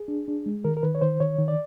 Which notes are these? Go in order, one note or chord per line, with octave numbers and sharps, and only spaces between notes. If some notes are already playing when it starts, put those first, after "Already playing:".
Already playing: G#4
D4
D4
G#3
D#3 A#4
A#4
D#3 B4
C#5
D#3 C5
D#3 C#5
D#3
D5